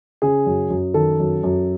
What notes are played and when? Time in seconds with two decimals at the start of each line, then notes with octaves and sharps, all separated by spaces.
0.22 C#3 G#4
0.46 F#2
0.70 F#2
0.94 D#3 A4
1.20 F#2
1.43 F#2